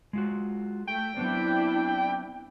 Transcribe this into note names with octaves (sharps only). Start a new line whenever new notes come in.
G#3 F4 F#4
A3 G5
F#3 B3 C4 D4 E4